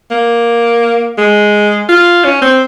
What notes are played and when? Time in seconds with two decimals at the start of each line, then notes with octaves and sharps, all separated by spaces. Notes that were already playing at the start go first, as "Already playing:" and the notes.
0.11 A#3
1.18 G#3
1.89 F4
2.24 C#4
2.42 C4